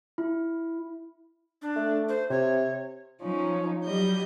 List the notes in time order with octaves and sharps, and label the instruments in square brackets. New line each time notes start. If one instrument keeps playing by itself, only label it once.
[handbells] E4
[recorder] D4
[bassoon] A3
[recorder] C5
[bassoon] C3 [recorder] C#5
[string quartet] F3 C#4 D#4
F#3 G3 D#5 G6